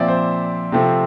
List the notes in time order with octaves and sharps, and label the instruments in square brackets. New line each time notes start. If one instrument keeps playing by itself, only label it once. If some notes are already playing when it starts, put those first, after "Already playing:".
Already playing: [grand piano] A#2 F3 C4 D5 E5
C5
C3 F3 A3 C4